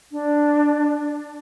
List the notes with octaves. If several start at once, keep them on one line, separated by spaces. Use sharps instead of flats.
D4